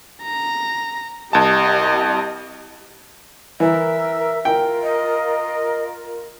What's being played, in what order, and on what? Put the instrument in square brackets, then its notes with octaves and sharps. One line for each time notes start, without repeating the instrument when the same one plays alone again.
[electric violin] A#5
[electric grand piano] C2 A5 [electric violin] G4 D#5
[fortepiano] E3 [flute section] A#4 E6 [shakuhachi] E5
[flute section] F4 A#4 [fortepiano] G5
[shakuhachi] D#5